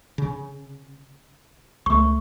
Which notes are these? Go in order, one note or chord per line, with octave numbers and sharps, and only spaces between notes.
C#3
C#2 A3 C#6